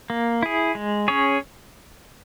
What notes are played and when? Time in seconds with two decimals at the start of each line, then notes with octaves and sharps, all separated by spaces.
0.10 A#3
0.43 E4 G#4
0.75 G#3
1.08 C#4 G#4 C#5